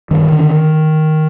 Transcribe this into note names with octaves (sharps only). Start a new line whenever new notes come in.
G2 D#3
D3